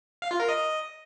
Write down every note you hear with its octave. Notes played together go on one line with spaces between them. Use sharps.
F5
F4
A#4
D#5